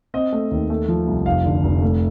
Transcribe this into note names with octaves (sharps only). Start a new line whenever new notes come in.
C4 D#5
A3
D#2
A3
F3
C2
F1 F5
D3
F1
A3